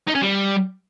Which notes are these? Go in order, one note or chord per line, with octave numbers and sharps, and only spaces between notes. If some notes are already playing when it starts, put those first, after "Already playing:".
D#4
C#4
G3